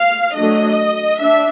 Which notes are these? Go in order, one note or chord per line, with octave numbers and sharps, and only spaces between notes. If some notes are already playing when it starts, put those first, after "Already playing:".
Already playing: F5
F#3 A3 D4 D#5
D4 E5